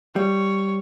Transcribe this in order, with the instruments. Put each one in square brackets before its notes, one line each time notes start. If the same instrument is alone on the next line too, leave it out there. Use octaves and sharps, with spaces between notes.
[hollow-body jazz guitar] G3 [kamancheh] C#5